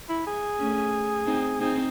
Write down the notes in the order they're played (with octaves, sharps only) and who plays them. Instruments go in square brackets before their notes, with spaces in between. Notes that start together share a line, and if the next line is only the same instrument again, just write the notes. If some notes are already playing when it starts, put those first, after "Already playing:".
[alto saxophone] E4
G#4
[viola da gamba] A3 C#4
C4 D#4
[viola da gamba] C4 D#4 [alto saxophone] G#4